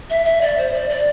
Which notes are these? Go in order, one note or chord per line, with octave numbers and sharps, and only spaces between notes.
E5
E5
D5
C5
D5
D5